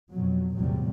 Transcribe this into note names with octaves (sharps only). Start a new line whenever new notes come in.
F2 B2 F#3
A#1 E2 A2 C3 F#3 G3